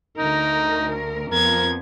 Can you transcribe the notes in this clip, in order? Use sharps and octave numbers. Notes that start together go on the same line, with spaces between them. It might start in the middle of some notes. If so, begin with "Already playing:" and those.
D2 D#4 A#4
F2 F3 B3 A#4 G#6